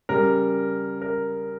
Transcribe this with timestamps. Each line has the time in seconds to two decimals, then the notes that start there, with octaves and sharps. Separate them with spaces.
0.09 C#3 G3 A#4
1.02 A#4